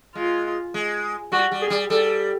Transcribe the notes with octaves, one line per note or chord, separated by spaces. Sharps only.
G#3 F4
G#3
G3 F#4
G3
G#4
G3
G3 A4